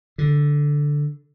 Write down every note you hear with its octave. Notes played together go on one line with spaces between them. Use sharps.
D3